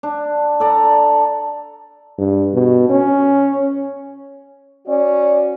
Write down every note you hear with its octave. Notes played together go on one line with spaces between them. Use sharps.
D4
A4 D5 A#5
G2
B2
C#4
C#4 F#4 D5